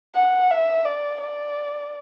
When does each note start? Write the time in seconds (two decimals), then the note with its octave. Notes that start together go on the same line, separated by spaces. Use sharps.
0.15 F#5
0.51 E5
0.85 D5
1.21 D5